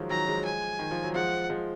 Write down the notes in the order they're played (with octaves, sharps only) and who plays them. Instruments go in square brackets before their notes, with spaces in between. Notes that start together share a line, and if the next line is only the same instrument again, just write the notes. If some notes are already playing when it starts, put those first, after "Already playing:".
Already playing: [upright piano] D#3 F3 F#3 G#3
[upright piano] D#3 F#3 [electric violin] A#5
[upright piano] F3 G#3
[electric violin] G#5
[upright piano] D#3
F3
F#3
[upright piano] F3 G#3 [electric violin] F#5
[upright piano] F3 G#3